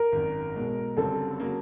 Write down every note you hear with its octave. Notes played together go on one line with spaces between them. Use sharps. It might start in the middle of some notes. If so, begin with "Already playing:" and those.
Already playing: A#4
G#1 F#2 D#3
B1 B2 G#3
F#1 F#2 D3 G3 C4 A4
C#3 F#3 A#3